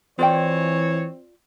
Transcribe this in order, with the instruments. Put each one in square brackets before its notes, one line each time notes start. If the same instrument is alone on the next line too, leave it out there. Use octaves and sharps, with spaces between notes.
[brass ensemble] E3 C#5 [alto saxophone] C4 [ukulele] F4 D5 G5